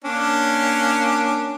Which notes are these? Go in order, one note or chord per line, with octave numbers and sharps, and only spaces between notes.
A#3 C#4 D4